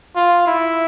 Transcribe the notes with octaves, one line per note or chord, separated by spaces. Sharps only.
F4
E4